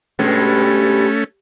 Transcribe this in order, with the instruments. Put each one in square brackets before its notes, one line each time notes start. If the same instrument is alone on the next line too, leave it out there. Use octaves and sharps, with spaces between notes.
[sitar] G2 B2 G#3 [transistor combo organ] A3 C#4